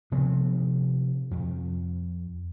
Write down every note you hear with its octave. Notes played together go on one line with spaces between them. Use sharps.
C3 F3 B3 C4
F2